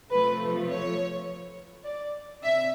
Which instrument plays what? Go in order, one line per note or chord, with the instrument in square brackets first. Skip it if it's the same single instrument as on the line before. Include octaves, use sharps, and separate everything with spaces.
[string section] C3 F3 A3 B4
C#5
D5
C3 E5